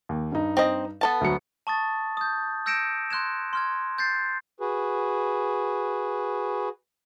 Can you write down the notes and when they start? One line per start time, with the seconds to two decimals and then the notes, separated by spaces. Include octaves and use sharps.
0.09 D#2
0.32 G2 D#4
0.57 C4 D#5
1.01 B3 A4 A5
1.21 D2 F#3 C#7
1.67 A5 C#6 D#6 A6
2.17 D#6 G6
2.66 E6 G6 A#6 C#7 D7 E7
3.10 C6 F#6 G#6 E7
3.53 C6 F6 G#6
3.98 G6 A6 C7
4.60 F#4 G#4 B4